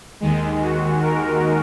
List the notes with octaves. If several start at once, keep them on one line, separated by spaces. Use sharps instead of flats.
D#2 D#3 G#3
F#4
A#4